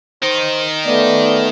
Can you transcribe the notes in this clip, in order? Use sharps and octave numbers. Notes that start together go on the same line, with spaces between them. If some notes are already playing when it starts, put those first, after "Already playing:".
D#3 D#4 C5
A3 B3 D5